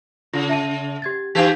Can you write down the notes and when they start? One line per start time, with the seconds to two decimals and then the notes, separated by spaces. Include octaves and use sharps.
0.33 C#3 F4
0.49 E5 A5 D#7
1.02 G4 G#6 A6
1.35 E3 D#4 G4 G#4 G#6 B6